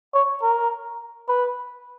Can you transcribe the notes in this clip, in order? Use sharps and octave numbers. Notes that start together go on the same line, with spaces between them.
C#5
A#4
B4